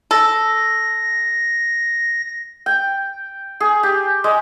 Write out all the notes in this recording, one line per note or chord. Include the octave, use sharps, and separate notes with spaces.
A4 A#6
G5
G#4
G4
G#3